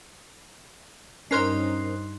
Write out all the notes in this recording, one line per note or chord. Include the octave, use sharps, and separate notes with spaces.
G2 C#4 D#4 A#4 C5 C6 F#6 C7